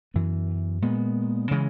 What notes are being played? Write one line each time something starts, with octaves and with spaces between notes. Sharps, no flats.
F#2 E3 B3
A#2 G#3 B3
C#3 E3 G#3